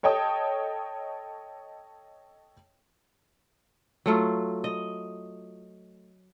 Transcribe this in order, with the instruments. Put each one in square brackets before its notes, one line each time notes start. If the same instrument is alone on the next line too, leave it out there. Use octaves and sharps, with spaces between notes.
[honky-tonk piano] A4 C#5 D#5 G5 A5 D#6
[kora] F#3 A3 F4
D#5